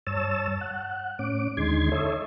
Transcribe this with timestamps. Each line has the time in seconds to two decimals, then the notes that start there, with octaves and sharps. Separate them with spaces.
0.07 G2 C#5 A5 E6
0.61 F#5
1.19 A2 C#4 D6
1.57 D#2 D3 G#3 D#4 C6 G#6
1.92 A4 C#5 D#5 E5